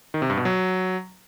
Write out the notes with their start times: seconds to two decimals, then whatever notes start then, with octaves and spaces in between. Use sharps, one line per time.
0.14 D#3
0.22 C3
0.30 G2
0.37 B2
0.45 F#3